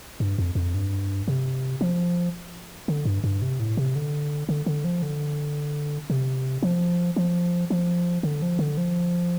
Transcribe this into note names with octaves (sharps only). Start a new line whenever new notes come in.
G2
F2
F2
G2
C3
F3
D3
G2
G2
C3
A2
C3
D3
D3
D3
F3
D3
C3
F3
F3
F3
D3
F3
D3
F3